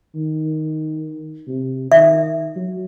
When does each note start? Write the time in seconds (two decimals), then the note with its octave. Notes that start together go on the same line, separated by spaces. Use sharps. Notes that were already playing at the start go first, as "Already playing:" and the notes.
0.15 D#3
1.47 C3
1.92 D#3 E5
2.56 F#3